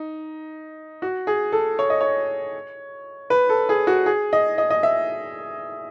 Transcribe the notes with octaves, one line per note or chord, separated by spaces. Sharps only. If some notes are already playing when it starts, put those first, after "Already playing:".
Already playing: D#4
F#4
G#4
A4
C#5
D#5
C#5
B4
A4
G#4
F#4
G#4
D#5
D#5
D#5
E5